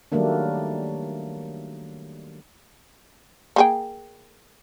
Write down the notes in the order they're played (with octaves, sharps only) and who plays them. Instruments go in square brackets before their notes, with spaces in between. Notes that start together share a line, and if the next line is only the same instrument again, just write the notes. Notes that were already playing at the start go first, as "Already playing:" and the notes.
[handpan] D#3 F#3 G3 A3 A#3 D4
[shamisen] A#3 G#4 G5